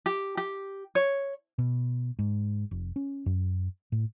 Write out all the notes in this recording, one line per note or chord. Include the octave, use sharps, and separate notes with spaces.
G4
G4
C#5
B2
G#2
F1
C#4
F#2
A2